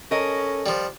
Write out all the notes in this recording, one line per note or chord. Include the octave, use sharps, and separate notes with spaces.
C#4 A4 A#4 D#5
F3 G3